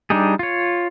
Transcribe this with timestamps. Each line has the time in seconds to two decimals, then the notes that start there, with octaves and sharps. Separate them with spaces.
0.10 G3 D4 D#4 G4 G#4
0.39 F4 C#5